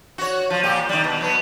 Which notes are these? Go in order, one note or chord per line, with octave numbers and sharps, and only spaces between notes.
F#4 C#5
F3
A#2 G4
D#3 G3
B2
F#3 B3